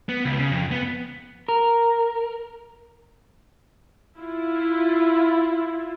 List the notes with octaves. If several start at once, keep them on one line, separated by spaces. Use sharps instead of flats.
B3
C#2
C#3
F2
B3
A#4
E4 F4